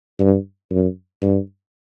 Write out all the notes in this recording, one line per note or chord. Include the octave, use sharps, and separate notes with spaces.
G2
F#2
G2